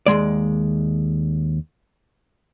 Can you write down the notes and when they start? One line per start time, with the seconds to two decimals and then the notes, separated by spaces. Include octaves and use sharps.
0.07 D#2 C#3 G#3 D5